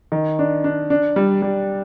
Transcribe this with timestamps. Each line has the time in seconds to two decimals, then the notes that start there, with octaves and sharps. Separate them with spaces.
0.12 D#3
0.39 D4
0.64 D4
0.90 D4
1.16 G3
1.42 G3